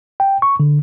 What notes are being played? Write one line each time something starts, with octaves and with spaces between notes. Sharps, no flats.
G5
C#6
D3